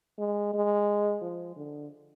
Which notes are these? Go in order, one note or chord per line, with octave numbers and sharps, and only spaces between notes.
G#3
G#3
F3
D3